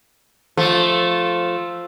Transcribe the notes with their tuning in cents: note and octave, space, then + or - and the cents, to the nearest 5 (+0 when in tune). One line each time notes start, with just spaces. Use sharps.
F3 +0 A3 -5